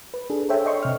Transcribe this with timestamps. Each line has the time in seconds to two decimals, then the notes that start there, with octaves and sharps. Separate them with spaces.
0.14 B4
0.30 D4 G#4 A4
0.49 A4 C5 C#5 E5 G5
0.66 D5 D#5 G5 C6 C#6
0.82 C3 F6